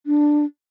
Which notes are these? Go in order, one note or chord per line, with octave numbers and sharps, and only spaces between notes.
D4